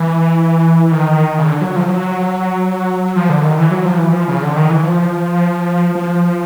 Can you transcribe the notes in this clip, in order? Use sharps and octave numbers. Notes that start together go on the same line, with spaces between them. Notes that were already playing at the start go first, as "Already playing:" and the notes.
Already playing: E3
D#3
C#3
D3
F#3
F3
F#3
F3
D3
D#3
E3
F#3
F3
E3
F3
C#3
D3
D#3
E3
F3
F3